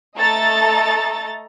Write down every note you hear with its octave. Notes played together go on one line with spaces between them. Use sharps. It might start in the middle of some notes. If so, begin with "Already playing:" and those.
A3 A4 D#5 A#5 A6